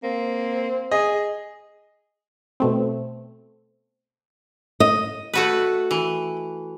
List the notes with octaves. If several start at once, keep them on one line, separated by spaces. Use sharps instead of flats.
A#3 C4
G#4 D#5
G#4
B2 A3 C4
D#5
A3 F#4 B4
E3